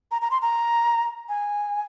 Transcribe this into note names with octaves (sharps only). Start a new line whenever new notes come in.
A#5
A#5
C6
A#5
G#5